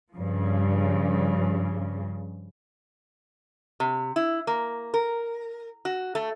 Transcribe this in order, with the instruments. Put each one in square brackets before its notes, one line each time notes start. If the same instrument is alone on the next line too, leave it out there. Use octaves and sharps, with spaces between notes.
[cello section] G2 C#3 F3
[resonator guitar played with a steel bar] C3
E4
A#3
A#4
F#4
A3